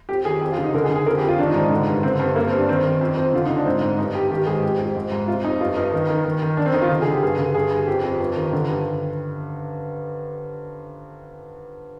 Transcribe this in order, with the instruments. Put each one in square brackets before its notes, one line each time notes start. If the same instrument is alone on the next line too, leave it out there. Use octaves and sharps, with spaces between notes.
[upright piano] F2 G4
D#3 G#4
F2 G4
F4
D3
D#4
D3 A#4
G#4
D3
G#4
F2 A#4
G4
F2
F4
D#3 D4
D#4
G#2 D4
D3
G2
D3 C4
G2 C4
G2 A#3
C4
G2
D4
D#3 C4
D#3
F2
F2 C4
D3 F4
D3 D#4
D4
G#2 C4
G#2
G2 D#4
G2 G4
D#3 G4
G#2 G#4
F2 G4
F2
G#2
G#2
C3 F4
F2 D#4
G2 F4
G2 D#4
D#3
D#3
D#3
D#3
D#3 D4
C4
D#3 D#4
F4
D3
G#4
D3
G4
G2 G#4
D3
G2 G#4
G2
F2 G4
F2
G2
D#3
D3
G2